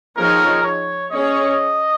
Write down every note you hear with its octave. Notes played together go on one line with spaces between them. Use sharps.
F3 C4 D#4 G#4 A#4 C#5
C#5
C#4 G#4 C#5 D#5